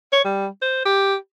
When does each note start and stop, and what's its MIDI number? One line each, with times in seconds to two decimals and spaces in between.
0.12 0.22 73
0.25 0.47 55
0.62 0.84 72
0.85 1.16 67